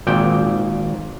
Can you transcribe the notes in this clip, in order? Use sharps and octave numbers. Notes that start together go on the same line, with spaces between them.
G#1 A#2 G5